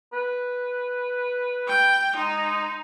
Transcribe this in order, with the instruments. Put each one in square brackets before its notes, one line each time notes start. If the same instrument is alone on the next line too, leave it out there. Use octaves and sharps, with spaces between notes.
[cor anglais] B4
[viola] G5
[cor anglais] G#3 [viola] D#4